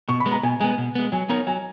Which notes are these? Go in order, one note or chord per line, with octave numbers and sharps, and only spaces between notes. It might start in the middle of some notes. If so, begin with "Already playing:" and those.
B2 C#6
B5
G#3 B3
A#5
B2 G#5
G#3 B3 G#5
B2
G#3 B3
F#3 G#5
B3 D#4 A#4 C#5 A#5
F#3 G#5